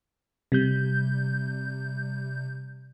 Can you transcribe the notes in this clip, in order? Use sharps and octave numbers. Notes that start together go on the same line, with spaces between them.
C3 G3 G6